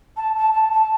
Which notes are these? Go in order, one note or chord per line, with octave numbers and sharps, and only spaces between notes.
A5
A5
A5
A5